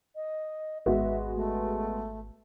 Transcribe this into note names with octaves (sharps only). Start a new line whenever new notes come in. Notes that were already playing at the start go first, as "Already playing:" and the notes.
D#5
G#1 G#3 B3 F#4 E5
A3